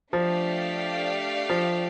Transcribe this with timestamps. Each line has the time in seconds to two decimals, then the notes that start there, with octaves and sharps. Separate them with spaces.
0.13 F3 A3 D4 G4 D5 F5
1.49 F3